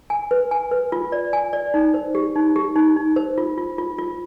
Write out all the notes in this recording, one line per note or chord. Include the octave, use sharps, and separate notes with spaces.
G#5
B4
G#5
B4
F4
D5
G#5
D5
D#4
C5
G4
D#4
G4
D#4
D#4
C5
F4
F4
F4
F4